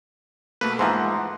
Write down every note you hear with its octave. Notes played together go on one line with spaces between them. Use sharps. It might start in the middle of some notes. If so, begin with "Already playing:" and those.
B2 A3 A#3 B4
G#2 E3 F3 F#5 A#5 C6